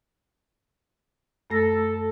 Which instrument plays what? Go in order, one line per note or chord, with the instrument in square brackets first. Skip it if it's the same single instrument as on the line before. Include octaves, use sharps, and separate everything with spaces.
[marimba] F#2 A3 A#6 [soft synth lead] A4